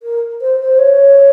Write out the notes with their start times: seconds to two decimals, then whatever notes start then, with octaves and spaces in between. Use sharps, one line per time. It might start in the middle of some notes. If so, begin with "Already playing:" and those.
0.02 A#4
0.41 C5
0.60 C5
0.78 C#5